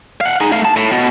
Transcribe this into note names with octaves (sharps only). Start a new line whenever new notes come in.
F5 F#5
D#4 G#4
A3 F5
A5
A2
B2